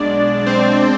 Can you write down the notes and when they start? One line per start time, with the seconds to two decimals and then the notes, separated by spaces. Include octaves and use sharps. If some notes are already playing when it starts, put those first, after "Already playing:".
Already playing: B1 B2 G#3 D4 D5
0.46 C4 C5